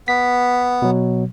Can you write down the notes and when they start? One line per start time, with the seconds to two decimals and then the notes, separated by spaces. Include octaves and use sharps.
0.08 B3 B6
0.82 B2 F#3